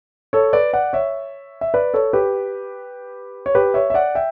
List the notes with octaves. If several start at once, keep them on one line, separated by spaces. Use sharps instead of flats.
A4 C#5
B4 D5
D5 F#5
C#5 E5
E5
B4 D5
A4 C#5
G4 B4
C#5
G4 B4
C#5 E5
E5
D5 F#5
E5 G5